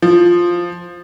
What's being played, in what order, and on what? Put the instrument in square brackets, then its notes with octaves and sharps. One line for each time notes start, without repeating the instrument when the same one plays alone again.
[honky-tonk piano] F3